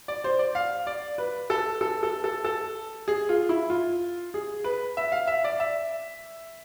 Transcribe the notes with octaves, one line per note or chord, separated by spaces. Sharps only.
D5
C5
D5
F5
D5
B4
A4
A4
A4
A4
A4
G#4
F4
E4
F4
G#4
B4
E5
F5
E5
D5
E5